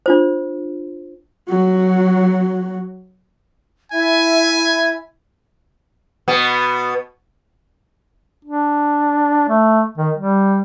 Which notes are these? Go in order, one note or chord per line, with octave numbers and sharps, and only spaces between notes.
D4 F4 C5
F#3 F#4
E4 E5 G#5
B2 B3
D4
A3
D#3
G3